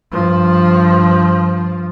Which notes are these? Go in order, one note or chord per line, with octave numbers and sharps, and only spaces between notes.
G2 F3